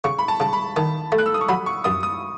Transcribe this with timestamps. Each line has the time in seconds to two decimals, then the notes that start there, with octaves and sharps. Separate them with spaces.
0.04 C#3 C#6
0.19 B5
0.28 A5
0.40 C#3 A5
0.53 B5
0.76 D#3 A5
1.12 A3
1.18 F#6
1.26 E6
1.34 D#6
1.41 C#6
1.48 F#3 B5
1.66 C#6
1.84 F#2 D#6
2.03 D#6